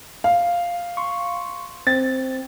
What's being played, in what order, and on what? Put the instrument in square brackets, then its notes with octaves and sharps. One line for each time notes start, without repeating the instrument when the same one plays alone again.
[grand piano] F5
[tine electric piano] C6 C#6
[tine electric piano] C4 [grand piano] A6